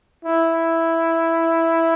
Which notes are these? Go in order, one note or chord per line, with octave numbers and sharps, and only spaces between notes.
E4